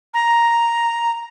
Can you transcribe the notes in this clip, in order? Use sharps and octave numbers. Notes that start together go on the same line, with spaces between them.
A#5